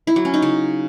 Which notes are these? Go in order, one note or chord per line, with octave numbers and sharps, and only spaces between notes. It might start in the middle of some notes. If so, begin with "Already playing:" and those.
E4
F#3
C#4
D#4
C#3